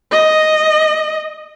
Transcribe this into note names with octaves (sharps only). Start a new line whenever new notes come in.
D#5